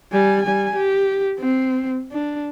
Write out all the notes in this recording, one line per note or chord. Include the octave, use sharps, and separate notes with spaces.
G3 G#5
G3 G#5
G4
C4
D4